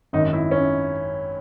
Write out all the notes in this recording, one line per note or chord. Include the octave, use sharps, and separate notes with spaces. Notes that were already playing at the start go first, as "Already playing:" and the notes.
G#1 F#2 D#3 D#4
E4
C#4